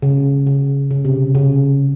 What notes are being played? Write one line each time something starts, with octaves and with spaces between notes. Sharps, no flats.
C#3
C#3
C#3
C3
C#3